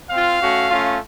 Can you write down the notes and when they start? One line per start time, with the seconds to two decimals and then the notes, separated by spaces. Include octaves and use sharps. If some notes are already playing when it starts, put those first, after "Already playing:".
0.09 C4 F4 F5
0.39 A3 C#4 F#4
0.67 A3 C#4 F4